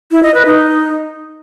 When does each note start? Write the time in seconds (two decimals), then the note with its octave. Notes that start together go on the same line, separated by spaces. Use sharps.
0.11 E4
0.23 D#5
0.34 B4
0.46 D#4